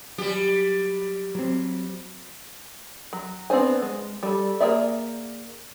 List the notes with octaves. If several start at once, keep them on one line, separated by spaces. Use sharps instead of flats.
F#3 G3 G4
F#3 C4
F#3
B3 C4 D4 C5 G#5
G#3
G3 A4
A#3 C4 G#4 D5 E5